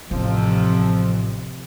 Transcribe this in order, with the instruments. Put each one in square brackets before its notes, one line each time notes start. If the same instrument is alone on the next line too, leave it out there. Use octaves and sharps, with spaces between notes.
[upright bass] A1 [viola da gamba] F2 C3 [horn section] F3